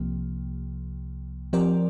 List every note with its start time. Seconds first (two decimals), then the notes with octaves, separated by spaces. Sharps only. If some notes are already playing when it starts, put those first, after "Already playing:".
Already playing: C2 C3 F3 A#3
1.53 F3 C4 G4 A#4 D5